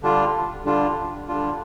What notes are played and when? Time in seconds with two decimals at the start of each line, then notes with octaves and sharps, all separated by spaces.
0.02 D3 G3 D4 F4
0.65 D3 G3 D4 F4
1.28 D3 G3 D4 F4